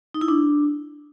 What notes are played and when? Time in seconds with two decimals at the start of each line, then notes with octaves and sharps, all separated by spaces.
0.14 D#4
0.21 E4
0.28 D4